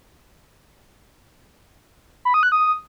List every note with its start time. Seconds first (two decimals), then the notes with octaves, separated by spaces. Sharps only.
2.25 B5
2.34 D#6
2.43 F#6
2.52 D#6